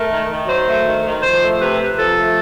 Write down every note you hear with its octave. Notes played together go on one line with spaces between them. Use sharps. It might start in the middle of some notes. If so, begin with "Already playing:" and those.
Already playing: A3 A#4
D#3
D#3
F#3 C5
A3
D#3
D#3
F3 C5
A3
C3 B4
C3
F3 A4
A3